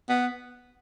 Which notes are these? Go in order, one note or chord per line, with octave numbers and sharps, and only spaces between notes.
B3